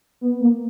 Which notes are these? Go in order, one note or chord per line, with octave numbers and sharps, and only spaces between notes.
B3
A#3